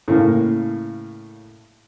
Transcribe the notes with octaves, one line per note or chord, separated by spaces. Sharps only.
A2 C#3 A#3